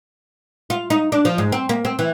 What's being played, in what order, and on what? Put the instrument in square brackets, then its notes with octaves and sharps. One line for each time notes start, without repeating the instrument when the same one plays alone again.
[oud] F4
D#4
D4
F3
G#2
C4
A#3
C4
E3